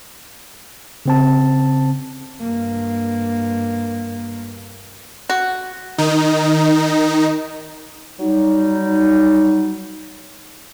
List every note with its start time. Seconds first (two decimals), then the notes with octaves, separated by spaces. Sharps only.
1.06 C#3 C4 A5
2.42 G2 A#3
5.30 F#4
5.98 D#3 D#4
8.19 F#3 G3 D#4